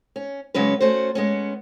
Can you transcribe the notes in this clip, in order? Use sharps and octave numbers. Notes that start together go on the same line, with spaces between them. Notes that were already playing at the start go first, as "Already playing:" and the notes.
C#4
C#3 F#3 G#3 C#4 B4
A3 C#4 F#4 C5
G#3 B3 C#4